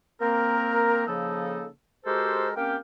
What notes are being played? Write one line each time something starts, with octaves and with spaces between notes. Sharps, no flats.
A#3 C4 A#4
C#3 F3 A#3 D#4 A4
G#3 F#4 G4 A4 A#4 C5
A#3 C4 C#4 G4 F5 G5